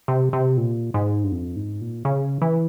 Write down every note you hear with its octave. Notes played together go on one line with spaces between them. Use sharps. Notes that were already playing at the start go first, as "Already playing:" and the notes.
C3
C3
A#2
G#2
G2
F2
G#2
A#2
C#3
E3